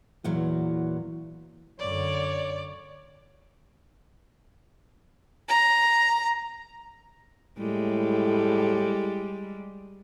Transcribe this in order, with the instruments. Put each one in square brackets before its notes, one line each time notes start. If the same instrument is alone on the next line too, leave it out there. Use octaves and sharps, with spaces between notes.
[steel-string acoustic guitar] E2 A#2 F#3 [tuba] E3
[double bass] F#2 D3 [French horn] C#5 [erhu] D5
[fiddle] A#5
[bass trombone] A2 [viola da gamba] G3 G#3